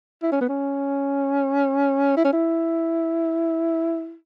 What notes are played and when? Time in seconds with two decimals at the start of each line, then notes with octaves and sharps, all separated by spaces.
0.23 E4
0.32 C#4
0.41 B3
0.49 C#4
2.17 E4
2.25 C#4
2.33 E4